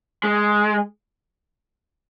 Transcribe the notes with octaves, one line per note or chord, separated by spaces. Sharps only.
G#3